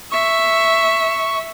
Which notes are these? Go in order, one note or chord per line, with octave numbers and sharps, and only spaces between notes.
E5 C#6